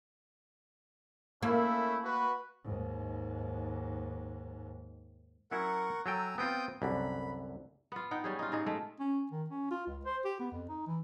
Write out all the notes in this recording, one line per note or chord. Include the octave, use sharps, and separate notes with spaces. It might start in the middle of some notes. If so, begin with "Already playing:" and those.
A3 A#3 C#4 E4
F#4 B4
D#2 G#2
F#3 C#4 E4 A#4 F#5 C#6
F#3 A4 G5 G#5 A#5 E6
B3 C4 F4 G5 D#6 G6
C2 F#2 D3 B5
B3 F4
D#4 F#5 G5
G3 C#4 G#4
D#4 F4
G#2 G#3 D#4
G#3 A3
C#4
D#3
C#4
F4
C#2
C5
G4
B3
F2
D#4
E3